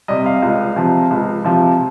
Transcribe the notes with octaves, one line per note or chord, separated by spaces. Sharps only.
C3 G3 D#5
F5
C#2
C3 F3
C#2
C3 F3